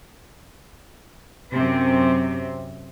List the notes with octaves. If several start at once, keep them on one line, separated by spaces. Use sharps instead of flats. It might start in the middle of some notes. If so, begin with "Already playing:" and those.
F#2 C3 C4